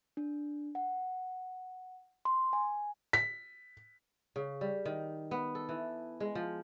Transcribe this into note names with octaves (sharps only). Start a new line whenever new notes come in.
D4
F#5
C6
G#5
B6
C#3
G3
D#3
B3
A4
E3
G#3
F3